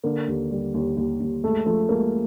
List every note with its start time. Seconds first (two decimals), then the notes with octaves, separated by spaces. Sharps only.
0.04 D3 A#3
0.28 D#2
0.51 G3
0.74 D#2
0.96 D#2
1.20 D#2
1.44 G#3 A3
1.66 F3 A3
1.89 G#3 A#3